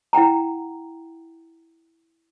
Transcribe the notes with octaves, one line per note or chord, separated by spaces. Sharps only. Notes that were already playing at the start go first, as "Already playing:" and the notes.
E4 F#5 G5 A#5